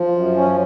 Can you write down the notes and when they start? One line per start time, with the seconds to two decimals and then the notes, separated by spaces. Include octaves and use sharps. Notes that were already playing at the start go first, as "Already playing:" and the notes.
Already playing: F3
0.15 F#2
0.36 C#4